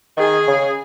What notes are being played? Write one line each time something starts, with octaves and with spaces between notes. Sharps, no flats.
D#3 G#4
C#3